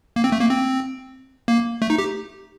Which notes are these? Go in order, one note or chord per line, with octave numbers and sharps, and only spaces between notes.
A#3
C4
A3
A#3
C4
A#3
A3
D#4
G4